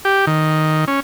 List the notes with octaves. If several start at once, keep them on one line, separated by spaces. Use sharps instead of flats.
G4
D#3
C#4